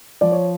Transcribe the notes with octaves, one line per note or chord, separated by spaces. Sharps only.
F3 D5
C#5